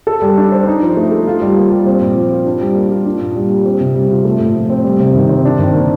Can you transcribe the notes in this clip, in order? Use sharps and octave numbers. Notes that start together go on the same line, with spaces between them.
A4
G3
D4
C5
D#4
F3
A3
A4
F4
G3
A#3
G3
C4
A#2
F3
F4
D4
G3
A#3
F4
D4
A#2
G3
G4
C4
C3
G3
F4
A3
A2
F3
C4
G3
C3
D#3
C4
D4
D#3
A#3